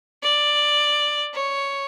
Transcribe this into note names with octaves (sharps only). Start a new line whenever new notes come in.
D5
C#5